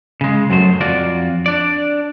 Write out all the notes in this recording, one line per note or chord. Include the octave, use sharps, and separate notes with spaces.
C#3 G#3
F#2 F#3 A3 C5
F2 F4 F#4 D5
D4 D5